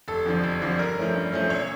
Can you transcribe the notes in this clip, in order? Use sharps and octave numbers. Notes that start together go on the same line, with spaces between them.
F1 A4
F2 D3 F3
F1
F2 D3 F3
G2 A#4
F3 A3 C#4
G2
F3 A3 C#4
E1 C#5